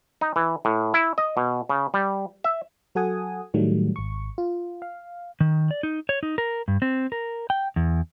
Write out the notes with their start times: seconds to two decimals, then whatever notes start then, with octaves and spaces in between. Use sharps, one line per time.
0.21 D#4
0.36 E3
0.65 A2
0.94 E4
1.18 D#5
1.37 B2
1.69 C#3
1.94 G3
2.44 E5
2.95 F#3 F#4 A4 F#5 G#5 D#6
3.54 A2 D#3 F#3 G3 A3
3.96 G#1 C#6
4.38 F4
4.82 F5
5.40 D#3
5.71 D5
5.83 D#4
6.09 C#5
6.23 D#4
6.38 A#4
6.68 G2
6.82 C4
7.12 A#4
7.50 G5
7.76 E2